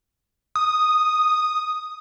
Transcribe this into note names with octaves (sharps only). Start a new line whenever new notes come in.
D#6